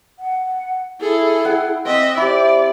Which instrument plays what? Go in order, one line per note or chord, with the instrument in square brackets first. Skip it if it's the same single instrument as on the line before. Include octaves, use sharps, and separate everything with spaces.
[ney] F#5
[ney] E4 [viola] G#4 A4
[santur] F#5 G5
[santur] C4 [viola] D#5 E5
[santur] E4 G4 [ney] C5 [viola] D5